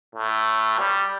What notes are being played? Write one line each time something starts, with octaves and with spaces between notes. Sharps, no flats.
A2
G3